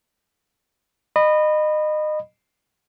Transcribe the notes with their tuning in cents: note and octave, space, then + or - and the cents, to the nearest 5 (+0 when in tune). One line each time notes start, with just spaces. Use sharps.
D#5 -25 B5 +0